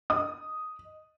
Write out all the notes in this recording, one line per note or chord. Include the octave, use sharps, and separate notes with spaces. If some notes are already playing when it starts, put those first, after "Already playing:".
D#5 D#6